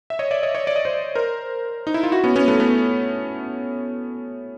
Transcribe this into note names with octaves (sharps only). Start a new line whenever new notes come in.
E5
C#5 D#5
D5 E5
C#5 D#5
C#5 D#5
D5
D#5
C5 D5
A#4 C5
D#4
E4
F4
E4 F#4
B3 C#4
B3 C#4
A3 B3
A3 B3